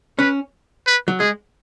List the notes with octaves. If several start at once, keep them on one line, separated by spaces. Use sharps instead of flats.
C#4 B4
B4
F#3
G#3 G#4